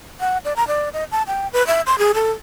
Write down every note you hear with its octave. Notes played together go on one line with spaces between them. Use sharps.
F#5
D5
A#5
D5
D#5
A5
G5
B4
E5
C6
G#4
A4